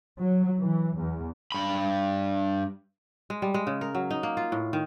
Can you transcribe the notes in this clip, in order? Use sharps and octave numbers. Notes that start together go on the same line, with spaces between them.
F#3
E3
E2
G2 B5
G#3
G3
G#3
C#3
A#4
F#3
D#4
A#3
F4
A2
D#3